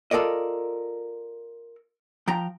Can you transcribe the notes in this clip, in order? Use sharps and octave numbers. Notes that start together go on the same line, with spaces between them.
F4 A4 A#4 D5 D#5
F3 G5 A#5